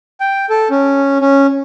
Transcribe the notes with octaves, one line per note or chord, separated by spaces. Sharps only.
G5
A4
C#4
C#4